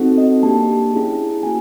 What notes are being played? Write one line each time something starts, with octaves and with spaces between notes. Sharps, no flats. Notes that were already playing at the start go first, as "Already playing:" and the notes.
Already playing: C4 D#4 F#4 A4
D#5
A#3 D4 G4 A5
C#4 E4 G#4
A#3 C#4 F#4 G#5